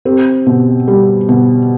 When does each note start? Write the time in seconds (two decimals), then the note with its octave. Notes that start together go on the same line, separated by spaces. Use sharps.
0.05 C4 G4
0.46 B2
0.88 G3
1.29 B2